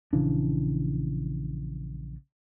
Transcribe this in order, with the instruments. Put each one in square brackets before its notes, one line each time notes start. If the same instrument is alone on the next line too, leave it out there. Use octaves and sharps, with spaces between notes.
[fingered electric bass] A#1 C#3 E3 D4